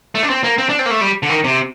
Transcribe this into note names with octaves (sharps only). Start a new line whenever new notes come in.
A3
D4
C4
A#3
C4
D4
C4
A#3
A3
G3
D3
D#3
C3